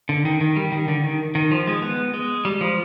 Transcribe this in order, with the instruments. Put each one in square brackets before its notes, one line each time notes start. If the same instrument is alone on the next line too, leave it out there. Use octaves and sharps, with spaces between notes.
[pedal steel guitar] D3
D#3
D#3
G3
D#3
D3
D#3
D#3
F3
G#3
B3
G#3
G3
F3